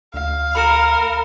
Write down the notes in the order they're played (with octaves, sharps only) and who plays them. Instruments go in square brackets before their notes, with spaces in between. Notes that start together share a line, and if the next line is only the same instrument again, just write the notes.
[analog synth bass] D2 [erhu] F5
[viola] A#4 [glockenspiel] B5 C#7 E7